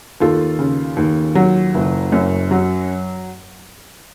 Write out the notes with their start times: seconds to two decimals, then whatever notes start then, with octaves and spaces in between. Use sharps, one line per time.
0.20 D#2 F4 A4
0.59 C#3
0.97 D#2
1.35 F#3
1.74 F#1
2.12 F#2
2.51 F#3